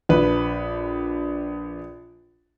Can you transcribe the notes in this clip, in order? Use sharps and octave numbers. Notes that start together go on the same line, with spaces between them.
A#1 B4